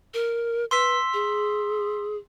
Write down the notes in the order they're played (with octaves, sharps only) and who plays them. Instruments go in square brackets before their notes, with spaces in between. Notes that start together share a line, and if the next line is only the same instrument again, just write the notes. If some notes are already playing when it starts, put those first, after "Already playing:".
[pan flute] A#4
[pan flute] B4 [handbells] C6 E6 B6
[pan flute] G#4